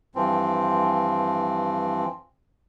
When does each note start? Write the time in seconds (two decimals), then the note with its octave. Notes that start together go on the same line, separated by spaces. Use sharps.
0.15 G2 E3 F3 C4